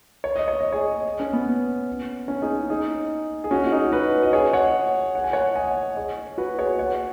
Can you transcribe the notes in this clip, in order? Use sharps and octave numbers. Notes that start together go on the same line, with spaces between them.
C#5
D#5
C#5
D#5
G#4 C#5
C#4
B3
C#4
D#4 G#4
D#4 G#4
G#4
C#4 F#4
F#4
D#4 G#4
F#4 B4
D#5
G#4 C#5
C#5 F#5
F#5
G#5
C#5 F#5
D#5 G#5
G#4 C#5
F#4 B4
G#4 C#5
C#5 F#5